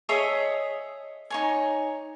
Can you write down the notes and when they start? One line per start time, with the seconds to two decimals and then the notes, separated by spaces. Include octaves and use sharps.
0.09 G#4 C#5 D#5 E5
1.30 D#4 C#5 G#5